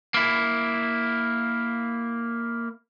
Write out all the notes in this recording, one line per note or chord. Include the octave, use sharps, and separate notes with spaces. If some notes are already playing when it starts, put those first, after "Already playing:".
A#3 E4